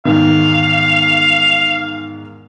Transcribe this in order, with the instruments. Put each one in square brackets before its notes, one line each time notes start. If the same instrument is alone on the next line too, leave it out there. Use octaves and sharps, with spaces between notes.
[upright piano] E2 G#2 D#3 [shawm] F5